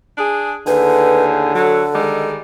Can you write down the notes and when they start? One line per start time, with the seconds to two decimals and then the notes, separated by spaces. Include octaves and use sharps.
0.17 D4 G#4
0.67 D#2 A2 D3 G#4 B4
1.56 F#3 A4
1.93 D#3 G3 G#3